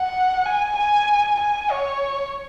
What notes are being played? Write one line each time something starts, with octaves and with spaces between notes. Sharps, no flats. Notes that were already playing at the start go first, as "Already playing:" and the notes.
Already playing: F#5
G#5
G#5
G#5
C#5